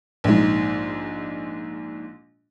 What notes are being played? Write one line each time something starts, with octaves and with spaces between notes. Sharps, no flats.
A#1 G#2